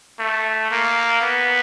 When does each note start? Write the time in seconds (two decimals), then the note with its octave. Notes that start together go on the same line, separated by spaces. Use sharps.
0.19 A3
0.71 A#3
1.22 B3